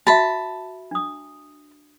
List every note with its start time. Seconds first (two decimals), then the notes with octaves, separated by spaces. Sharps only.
0.07 F#4 E5 A5 B5
0.91 D4 D#6